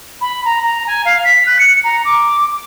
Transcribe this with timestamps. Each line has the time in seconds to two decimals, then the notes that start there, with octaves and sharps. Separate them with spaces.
0.21 B5
0.44 A#5
0.62 A#5
0.86 G#5
1.05 F5
1.24 B6
1.46 F#6
1.59 C#7
1.83 A#5
2.05 D6